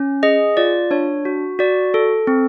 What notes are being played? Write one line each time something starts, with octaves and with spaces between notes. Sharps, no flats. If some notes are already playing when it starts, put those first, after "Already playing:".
Already playing: C#4
G#4 D#5
F4 D5
D4 C#5
F#4
F#4 D5
A4
C4